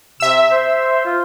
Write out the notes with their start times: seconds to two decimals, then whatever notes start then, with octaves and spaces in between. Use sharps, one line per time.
0.20 C3 E5 E6
0.51 C5
1.05 F4